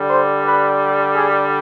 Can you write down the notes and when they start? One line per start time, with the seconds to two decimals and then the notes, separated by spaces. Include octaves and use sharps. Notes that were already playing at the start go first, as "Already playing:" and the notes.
Already playing: D3 G3
0.10 C5
0.45 B4
1.16 G#4